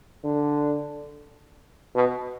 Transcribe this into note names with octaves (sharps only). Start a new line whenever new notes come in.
D3
B2